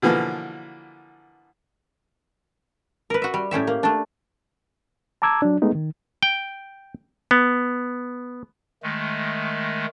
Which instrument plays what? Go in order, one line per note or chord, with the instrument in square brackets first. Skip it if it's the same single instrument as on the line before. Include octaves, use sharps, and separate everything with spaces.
[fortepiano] B2 D3 E3 F3 A#3
[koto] A#4 B4
F#4 E5
G3
A2 C#4 G4 E5
A#3
A3 D4
[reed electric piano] A5 A#5 D6 E6 G#6
F#3 D4
G#3 A3 B3 D#4
D#3
[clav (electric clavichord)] G5
B3
[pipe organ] D#3 G#3 A3